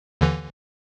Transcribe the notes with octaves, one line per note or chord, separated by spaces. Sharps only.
D#2 D3 E3